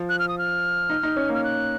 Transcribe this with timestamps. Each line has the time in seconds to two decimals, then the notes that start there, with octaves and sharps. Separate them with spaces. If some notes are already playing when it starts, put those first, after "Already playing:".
Already playing: F3
0.09 F#6
0.19 F6
0.29 D#6
0.38 F6
0.90 D#4
1.03 D#4
1.17 C#4
1.29 A#3 F6
1.44 F#6